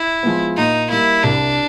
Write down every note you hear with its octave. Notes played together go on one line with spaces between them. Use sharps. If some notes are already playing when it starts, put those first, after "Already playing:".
Already playing: E4
F3 G#3 B3
A#2 D#4
G3 A#3 E4
C2 D4